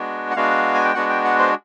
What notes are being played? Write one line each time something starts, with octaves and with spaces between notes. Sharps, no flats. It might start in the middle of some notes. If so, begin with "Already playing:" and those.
Already playing: G#3 B3 D4 F#4
F#5
G#3 B3 D4 F#4 F5
G#5
G5
G#3 B3 D4 F#4 F#5
G5
F#5
C5